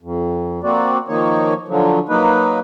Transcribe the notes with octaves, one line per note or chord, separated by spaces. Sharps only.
F2
A#3 C4 F#4 D5
D#3 F3 A#3 D#4 C#5
D3 F3 F#3
F#3 A#3 D#4 B4